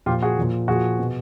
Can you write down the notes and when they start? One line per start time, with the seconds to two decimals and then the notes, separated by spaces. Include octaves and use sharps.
0.06 A#2 F3 F4 G4
0.22 F#4 G#4
0.38 A#2 F3
0.68 A#2 F3 F#4 G#4
0.99 B2